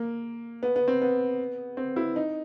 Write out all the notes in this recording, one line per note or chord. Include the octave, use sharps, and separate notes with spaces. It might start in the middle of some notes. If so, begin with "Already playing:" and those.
Already playing: A#3
B3
B3
C4
B3
C4
E4
D#4